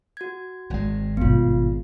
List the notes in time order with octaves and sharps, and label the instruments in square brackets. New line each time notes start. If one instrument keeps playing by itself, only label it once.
[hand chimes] F#4 G#6
[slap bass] G#1 G#3 [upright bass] D#3
[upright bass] G1 B2 [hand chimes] B3 F4